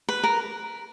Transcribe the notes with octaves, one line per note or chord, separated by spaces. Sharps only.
B4
A#4